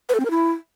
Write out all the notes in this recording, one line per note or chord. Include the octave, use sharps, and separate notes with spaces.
B4
A4
C4
A#4
E4